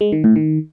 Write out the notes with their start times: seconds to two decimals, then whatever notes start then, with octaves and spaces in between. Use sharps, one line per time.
0.01 G#3
0.12 D#3
0.24 A2
0.36 D#3